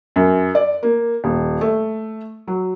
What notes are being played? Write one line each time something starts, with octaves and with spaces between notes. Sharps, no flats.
F#2
D5
A#3
D#1
A3
F#3